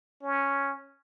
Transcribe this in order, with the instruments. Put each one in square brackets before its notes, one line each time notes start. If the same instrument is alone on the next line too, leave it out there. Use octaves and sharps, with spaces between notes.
[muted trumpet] C#4